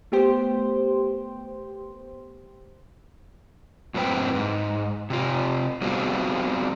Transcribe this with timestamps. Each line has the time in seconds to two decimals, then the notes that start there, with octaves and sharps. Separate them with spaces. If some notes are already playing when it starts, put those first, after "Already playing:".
0.12 A3 B3 G4 C5
3.94 F#2 A2 A#3 C4 B4 G5
4.35 G#2
5.10 C3 F4
5.81 G3 B3 C4 F4 F#4 G#4